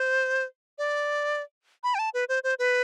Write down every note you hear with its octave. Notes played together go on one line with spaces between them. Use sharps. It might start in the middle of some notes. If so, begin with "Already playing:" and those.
Already playing: C5
D5
B5
G5
A5
B4
C5
C5
B4